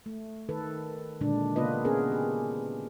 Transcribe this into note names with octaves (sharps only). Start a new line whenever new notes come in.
A3
D#3 A4 B4
A#2 D3 D#3 G#3 D4
C#3 A#3 B3 F4 B4 D#5
B3 C#4 G#4 A#4
G4